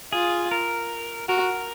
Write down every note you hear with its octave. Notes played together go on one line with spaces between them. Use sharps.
F4 G#4
A#4
F#4 A#4